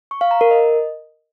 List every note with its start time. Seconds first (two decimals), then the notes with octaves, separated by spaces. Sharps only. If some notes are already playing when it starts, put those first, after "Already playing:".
0.11 C#6
0.21 F5
0.31 A#5
0.41 A#4
0.51 D#5